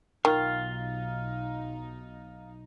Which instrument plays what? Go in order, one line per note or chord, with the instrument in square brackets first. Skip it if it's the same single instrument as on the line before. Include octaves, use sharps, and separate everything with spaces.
[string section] B1 D#4 [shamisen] D#3 [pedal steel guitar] F4 F5